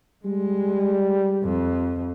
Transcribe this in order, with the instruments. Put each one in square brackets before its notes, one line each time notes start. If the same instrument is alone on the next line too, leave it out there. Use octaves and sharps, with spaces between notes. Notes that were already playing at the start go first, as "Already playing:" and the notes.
[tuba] G3 [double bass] G#3
[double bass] F2